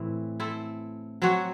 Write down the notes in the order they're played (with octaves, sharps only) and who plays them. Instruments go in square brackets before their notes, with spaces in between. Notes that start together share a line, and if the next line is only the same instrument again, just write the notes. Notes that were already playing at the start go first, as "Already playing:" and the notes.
Already playing: [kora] A2 E3 C4 E4
C4 E4 A4
F#3 C4 F#4 C#5